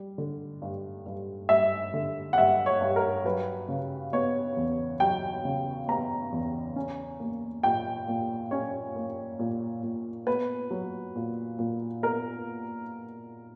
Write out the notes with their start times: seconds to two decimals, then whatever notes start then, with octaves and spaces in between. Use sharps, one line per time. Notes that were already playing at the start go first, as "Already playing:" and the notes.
Already playing: G3
0.18 D3
0.62 G2
1.06 G2
1.49 G3 E5
1.94 D3
2.33 F#5
2.37 G2 E5
2.66 C#5
2.81 G2
2.96 A#4
3.25 F#3 B4
3.68 C#3
4.13 B3 C#5
4.57 E2
5.00 F#3 G5
5.45 C#3
5.88 B3 A#5
6.32 E2
6.76 C#4
7.20 A#3
7.63 A#2 G5
8.08 A#2
8.51 C#4 C#5
8.96 A#3
9.39 A#2
9.83 A#2
10.27 B3 B4
10.71 F#3
11.16 A#2
11.59 A#2
12.02 B3 A#4